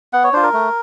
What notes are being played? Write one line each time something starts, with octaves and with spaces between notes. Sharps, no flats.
B3 F#5
C#5
D4 F4 C5
A#4
A3